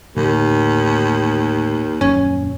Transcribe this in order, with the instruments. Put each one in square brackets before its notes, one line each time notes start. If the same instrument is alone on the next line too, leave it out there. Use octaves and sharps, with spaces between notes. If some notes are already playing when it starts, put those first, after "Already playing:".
[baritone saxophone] D#2 [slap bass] A2 D3 D#3
[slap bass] D#1 F#2 F#3 [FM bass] C#4